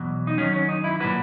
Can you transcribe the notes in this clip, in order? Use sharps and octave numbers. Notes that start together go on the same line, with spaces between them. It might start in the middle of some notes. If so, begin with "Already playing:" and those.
Already playing: E2 B2 F#3
D#4
F#2 D#3 F#3 C#4
C#4
D#4
E4
A#2 F#3 B4